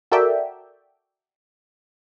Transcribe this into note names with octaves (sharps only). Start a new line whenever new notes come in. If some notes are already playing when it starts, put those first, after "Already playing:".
F#4 A4 A#4 D5 E5 G5